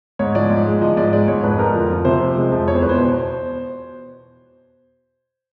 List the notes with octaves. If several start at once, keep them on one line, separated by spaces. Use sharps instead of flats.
G#2 C#5
F3 D5
G#2
G#3
F3 D#5
G#2 D5
G#3 D5
G#2 C#5
F2 B4
F2 A#4
F3
F3
C3 C5
F3
G#3
F2
E2 C#5
C5
E2 B4
C5
B2